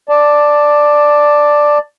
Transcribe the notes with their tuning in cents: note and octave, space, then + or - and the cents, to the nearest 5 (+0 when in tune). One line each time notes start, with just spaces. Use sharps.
D5 +5 A5 +0